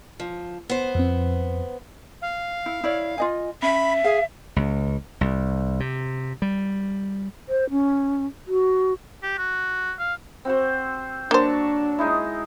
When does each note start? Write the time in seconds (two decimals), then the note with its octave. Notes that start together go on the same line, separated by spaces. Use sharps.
0.20 F3
0.69 B3 C5
0.95 F2 C4
2.22 F5
2.66 E4
2.84 E4 C#5 D5
3.18 F4 D#5 G#5
3.62 C#4 E5 B5
4.04 G#4 F5
4.56 C#2
5.21 C2
5.80 C3
6.42 G3
7.49 C5
7.70 C#4
8.47 F#4
9.23 G4
9.38 F#4
9.99 F5
10.45 C4 F#4 C5
11.31 F#3 A#3 D4 C5 A5 C#6
11.99 G#3 D#4 E4